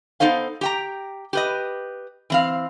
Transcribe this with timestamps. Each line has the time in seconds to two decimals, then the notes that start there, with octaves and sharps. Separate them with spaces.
0.20 B3 D#4 A4 C5 F5
0.61 G4 G5 A#5
1.33 G4 B4 D#5
2.30 E3 C4 F5